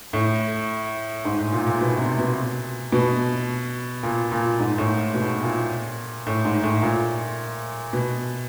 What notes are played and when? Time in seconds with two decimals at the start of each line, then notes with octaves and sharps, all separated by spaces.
0.13 A2
1.25 G#2
1.39 A2
1.52 A#2
1.67 A#2
1.81 B2
1.99 C3
2.18 B2
2.92 B2
4.03 A#2
4.32 A#2
4.59 G#2
4.78 A2
5.14 B2
5.43 A#2
6.27 A2
6.45 G#2
6.63 A2
6.82 A#2
7.93 B2